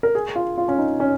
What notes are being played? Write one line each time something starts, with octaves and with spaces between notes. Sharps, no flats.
A#4
G#4
F4
F4
C#4
D#4
C#4